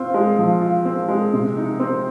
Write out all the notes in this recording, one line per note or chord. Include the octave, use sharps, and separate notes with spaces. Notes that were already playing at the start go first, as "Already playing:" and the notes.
Already playing: C4 F4
G#3
F3
F4
C4
G#3
C3
D#4
C4